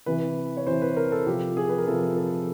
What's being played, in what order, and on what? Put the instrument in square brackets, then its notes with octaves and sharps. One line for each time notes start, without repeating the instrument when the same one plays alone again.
[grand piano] C3 E3 B4
C#5
C3 E3 C5
B4
A#4
A4
C3 F3 G4
G#4
B4
A#4
C3 F3 A4
A4